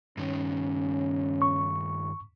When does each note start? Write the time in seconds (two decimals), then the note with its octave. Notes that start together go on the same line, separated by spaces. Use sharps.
0.17 G2 D#3 C#4
1.42 C#6